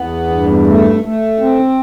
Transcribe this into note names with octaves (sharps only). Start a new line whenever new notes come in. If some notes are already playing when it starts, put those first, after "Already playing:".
Already playing: E2 B3
G2
A3
A3
C4